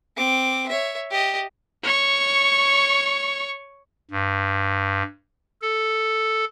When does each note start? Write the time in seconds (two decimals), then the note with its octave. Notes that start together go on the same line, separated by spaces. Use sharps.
0.16 C4 D6
0.68 C#5 E5
1.10 G4 D#5
1.83 C#5 C#6
4.11 G2
5.62 A4